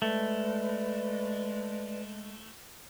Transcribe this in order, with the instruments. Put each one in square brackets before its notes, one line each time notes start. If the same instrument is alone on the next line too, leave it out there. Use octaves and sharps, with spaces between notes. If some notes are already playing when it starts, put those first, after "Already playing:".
[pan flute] G#3 [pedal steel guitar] A3 [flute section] B4 D5